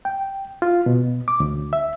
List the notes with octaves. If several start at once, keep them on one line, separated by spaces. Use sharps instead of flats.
G5
F4
B2
D6
D2
E5